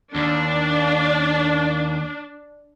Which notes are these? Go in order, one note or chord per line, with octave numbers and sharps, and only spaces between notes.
D#2 D4